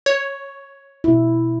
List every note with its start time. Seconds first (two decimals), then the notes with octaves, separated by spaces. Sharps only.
0.06 C#5
1.04 B2 E4